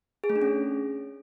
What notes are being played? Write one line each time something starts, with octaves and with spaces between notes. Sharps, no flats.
G#4
A3
D4
C#4